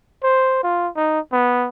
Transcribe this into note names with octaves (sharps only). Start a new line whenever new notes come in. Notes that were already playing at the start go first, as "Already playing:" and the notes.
C5
F4
D#4
B3